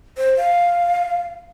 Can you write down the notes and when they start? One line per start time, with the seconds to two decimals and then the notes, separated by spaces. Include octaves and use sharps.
0.18 C5
0.37 F5